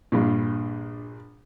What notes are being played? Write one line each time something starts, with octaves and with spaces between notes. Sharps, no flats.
A#1 G2 A#2